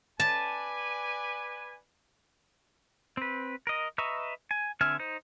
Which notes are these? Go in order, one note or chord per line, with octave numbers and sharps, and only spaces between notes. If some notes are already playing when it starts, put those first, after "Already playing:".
B4 D5 G#5 A5
C4 B4
A#4 D#5
B4 D#5 E5 A#5 C#6
G#5
D3 C4 E5 G#5 F6
D#4 C5